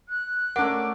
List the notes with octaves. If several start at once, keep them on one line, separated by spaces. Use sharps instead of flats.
F#6
A3 C#4 D4 A#4 F#5 D6